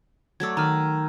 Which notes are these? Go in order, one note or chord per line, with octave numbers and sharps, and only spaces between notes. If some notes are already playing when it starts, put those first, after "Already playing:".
F#3 A3 D5 E6 G#6
D#3 A#5 F6